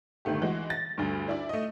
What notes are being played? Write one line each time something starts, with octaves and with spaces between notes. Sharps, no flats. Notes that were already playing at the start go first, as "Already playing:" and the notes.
G1 D#3 A3 G4
E3 G#3 F#4
A6 A#6
D2 G2
D4 E4 D5
A3 D#5